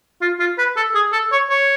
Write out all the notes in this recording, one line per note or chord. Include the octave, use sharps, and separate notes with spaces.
F4
F4
B4
A4
G#4
A4
C#5
C#5